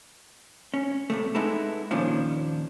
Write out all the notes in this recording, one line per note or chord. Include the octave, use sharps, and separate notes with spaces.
C#4
C2 C3 A3
G#3 B3 D#4 E4 A4
D#2 A#2 D#3 F3 C#4 D4